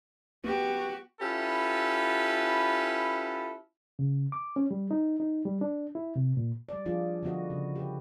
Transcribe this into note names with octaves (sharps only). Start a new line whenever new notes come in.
B3 F#4 G4
C#4 E4 F4 G4 A4 B4
C#3
D6
C#4
G3
D#4
D#4
G3
D4
E4
C3
A#2
G3 D5
F3 D4 F4 G#4
D3 F3 B3 F#4 D#5
C#3
G4 B4